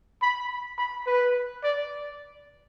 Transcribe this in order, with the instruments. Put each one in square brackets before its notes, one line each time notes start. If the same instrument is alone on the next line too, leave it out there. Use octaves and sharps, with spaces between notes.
[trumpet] B5
B5
B4
D5